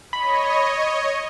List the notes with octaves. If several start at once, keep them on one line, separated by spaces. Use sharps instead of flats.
C#5 D#5 B5